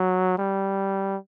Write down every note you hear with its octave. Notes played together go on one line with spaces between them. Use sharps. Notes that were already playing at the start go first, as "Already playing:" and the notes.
Already playing: F#3
G3